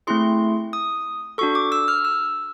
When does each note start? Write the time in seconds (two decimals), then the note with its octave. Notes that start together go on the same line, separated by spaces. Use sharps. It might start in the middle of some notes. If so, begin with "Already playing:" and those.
0.07 A3 C4 E4 G#4 C6
0.73 D#6
1.38 D4 F#4 A4 C#6
1.55 D6
1.72 E6
1.88 F6
2.05 E6